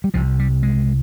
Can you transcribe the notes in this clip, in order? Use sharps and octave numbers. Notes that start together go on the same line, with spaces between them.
G3
C2 C3 F3
G3
G#3